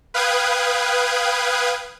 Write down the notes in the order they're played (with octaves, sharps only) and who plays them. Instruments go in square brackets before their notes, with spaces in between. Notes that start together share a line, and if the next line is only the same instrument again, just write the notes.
[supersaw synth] B4 F5 G5 D#6 F#6 G#6